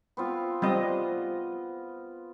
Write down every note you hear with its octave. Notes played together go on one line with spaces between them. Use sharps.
B3 C4 F4
G3 B3 C4 D#5